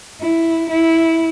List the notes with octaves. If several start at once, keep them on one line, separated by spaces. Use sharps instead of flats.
E4
E4